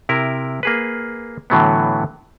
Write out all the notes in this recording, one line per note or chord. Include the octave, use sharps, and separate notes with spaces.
C3 E4 A#4
A#3 G#4 B4
A2 D3 E3 F#3 A3 B3